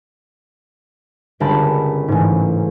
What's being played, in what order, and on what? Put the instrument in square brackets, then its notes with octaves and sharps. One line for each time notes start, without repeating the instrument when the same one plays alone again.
[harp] G1 C#2 A#4 G5 A5 B5
A1 G#2